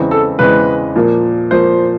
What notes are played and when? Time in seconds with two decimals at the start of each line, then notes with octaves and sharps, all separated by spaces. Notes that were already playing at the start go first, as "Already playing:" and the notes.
Already playing: E2 C#3 E3 G#3 C4
0.11 A4
0.39 E2 C#3 E3 G#3 C4 B4
0.96 A#2 F3 A#3
1.51 A#2 F3 A#3 C5